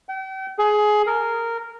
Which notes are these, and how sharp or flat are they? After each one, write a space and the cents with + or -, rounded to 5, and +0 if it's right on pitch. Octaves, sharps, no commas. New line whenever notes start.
G5 -40
G#4 +20
A#4 -10